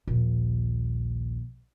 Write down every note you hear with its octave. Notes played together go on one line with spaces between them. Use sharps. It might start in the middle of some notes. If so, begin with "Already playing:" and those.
A#1 D#2